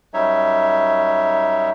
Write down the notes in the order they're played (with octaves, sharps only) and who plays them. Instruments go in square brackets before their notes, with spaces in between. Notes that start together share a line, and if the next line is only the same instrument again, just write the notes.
[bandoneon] F#2 G3 D#4 C#5 E5